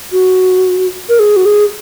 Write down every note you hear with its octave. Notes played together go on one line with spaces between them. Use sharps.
F#4
A#4
G#4
F#4
G#4